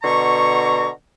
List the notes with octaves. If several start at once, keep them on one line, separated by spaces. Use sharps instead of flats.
B2 D3 A#5 C#6